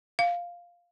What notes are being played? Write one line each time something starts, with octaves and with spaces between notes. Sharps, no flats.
F5